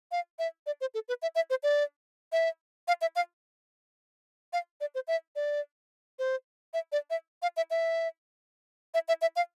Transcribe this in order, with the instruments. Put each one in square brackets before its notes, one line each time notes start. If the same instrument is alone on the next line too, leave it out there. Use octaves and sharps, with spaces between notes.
[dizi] F5
E5
D5
C5
A4
B4
E5
E5
C5
D5
E5
F5
E5
F5
F5
D5
C5
E5
D5
C5
E5
D5
E5
F5
E5
E5
E5
E5
E5
F5